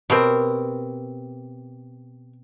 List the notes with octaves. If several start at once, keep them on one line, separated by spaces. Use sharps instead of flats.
B2 C4 G4 A#4